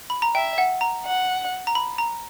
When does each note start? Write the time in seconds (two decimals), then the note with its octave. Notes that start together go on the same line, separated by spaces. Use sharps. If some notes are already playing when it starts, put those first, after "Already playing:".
0.10 B5
0.22 A#5
0.35 E5 G5
0.58 F#5
0.81 A#5
1.05 F#5
1.67 A#5
1.75 B5
1.98 A#5